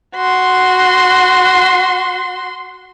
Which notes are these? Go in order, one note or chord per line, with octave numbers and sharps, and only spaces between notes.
F#4 C6